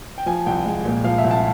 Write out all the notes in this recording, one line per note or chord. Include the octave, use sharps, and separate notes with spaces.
G5
F3 G#5
C2 G5
G#3
A#2
F3 F5
E5
C2
A5